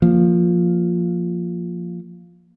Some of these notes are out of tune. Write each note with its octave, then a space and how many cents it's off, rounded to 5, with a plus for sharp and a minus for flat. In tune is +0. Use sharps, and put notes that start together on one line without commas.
F3 +0 A#3 +0